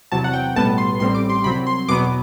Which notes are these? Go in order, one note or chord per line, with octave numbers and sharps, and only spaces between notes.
E2 C3 F#3 A5
F#5
G5
B1 A2 G3 B3 A5
C6
A1 A2 G3 C4 C6
D6
C6
C2 C3 F#3 C4 B5
C6
E2 B2 F#3 B3 D6